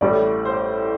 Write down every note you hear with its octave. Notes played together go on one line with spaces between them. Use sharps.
A1 A2 G3 D5
C5